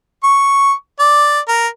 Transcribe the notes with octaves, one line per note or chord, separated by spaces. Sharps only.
C#6
D5
A#4